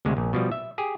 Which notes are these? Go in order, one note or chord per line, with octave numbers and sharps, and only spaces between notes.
D2 C3 G#3
A#1
B2 F3 G3
E5
G4 G#4